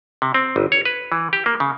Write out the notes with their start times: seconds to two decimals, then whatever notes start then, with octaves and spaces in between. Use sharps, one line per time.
0.22 C3
0.34 C4
0.56 G1
0.72 C#5
0.85 B4
1.12 E3
1.33 G4
1.46 A#3
1.60 C#3